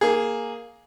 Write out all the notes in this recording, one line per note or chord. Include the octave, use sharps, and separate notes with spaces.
A#3 G#4